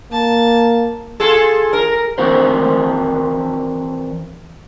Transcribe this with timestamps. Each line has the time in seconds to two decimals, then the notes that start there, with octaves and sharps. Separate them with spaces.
0.12 A#3 A5
1.20 F4 G#4 A4
1.73 A#4
2.18 E3 F#3 C4 F#4 A#4 C5